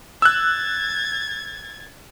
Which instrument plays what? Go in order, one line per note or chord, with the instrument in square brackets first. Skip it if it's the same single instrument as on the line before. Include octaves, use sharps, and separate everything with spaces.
[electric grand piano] E6 F#6 [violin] G#6 A6